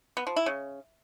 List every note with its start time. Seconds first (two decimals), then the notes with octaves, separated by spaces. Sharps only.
0.17 B3
0.27 F3
0.36 E4
0.46 C#3